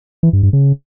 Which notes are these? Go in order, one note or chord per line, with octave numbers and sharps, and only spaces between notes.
E3
G2
G2
C#3